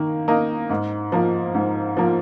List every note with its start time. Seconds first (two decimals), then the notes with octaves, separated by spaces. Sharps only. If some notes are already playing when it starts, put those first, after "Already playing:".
Already playing: D#3 A#3
0.28 A#3 D#4
0.70 G#2
1.12 F3 A#3
1.54 G#2
1.97 F3 A#3